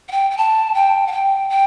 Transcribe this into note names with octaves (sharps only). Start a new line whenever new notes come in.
F#5
G5
G5
A5
G5
F#5
G5
G5